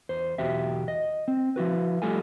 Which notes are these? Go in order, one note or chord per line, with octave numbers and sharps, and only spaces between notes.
E2 C5
B1 E2 F#4 G4 E5
D#5
C4
F3 E4 F#4 B4
F3 G3 A3 F4 A4 G#5